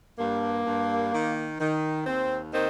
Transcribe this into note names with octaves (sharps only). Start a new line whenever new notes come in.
G2 A#3
G2
D#3
D#3
D#2 C4
D#3 C4